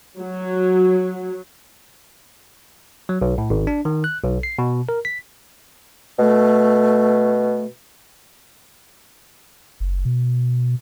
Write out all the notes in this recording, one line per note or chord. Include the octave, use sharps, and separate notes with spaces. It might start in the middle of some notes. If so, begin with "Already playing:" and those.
F#3
F#3
B1
A2
G#1
D4
D#3
F#6
B1
C7
B2
A#4
B6
B2 A3
F#1
B2